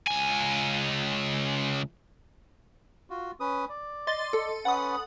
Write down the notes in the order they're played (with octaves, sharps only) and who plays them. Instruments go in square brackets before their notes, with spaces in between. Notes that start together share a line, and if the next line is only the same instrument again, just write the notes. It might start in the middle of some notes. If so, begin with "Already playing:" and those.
[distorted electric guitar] C#2 G#5
[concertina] F4 F#4
C#4 B4 D#6
D5
[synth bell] D#5 C6 A6
A4
[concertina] C#4 B4 [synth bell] F#5 D#6